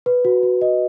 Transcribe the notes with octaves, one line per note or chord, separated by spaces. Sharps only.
B4
F#4
F#4
D#5